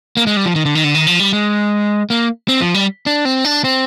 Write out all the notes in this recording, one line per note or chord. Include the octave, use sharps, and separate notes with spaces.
A#3
G#3
G3
F3
D#3
D3
D#3
D3
D#3
F3
G3
G#3
A#3
C4
F3
G3
D4
C4
D4
C4